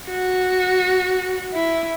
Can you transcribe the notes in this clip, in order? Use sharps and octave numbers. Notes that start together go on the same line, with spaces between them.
F#4
E4